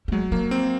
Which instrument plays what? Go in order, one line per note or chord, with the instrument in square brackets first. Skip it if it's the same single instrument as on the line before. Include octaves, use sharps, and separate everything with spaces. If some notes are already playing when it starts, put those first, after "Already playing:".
[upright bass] A#3
[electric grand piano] F#3 [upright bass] G#3
[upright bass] F#3 [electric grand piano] A#3
[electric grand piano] C4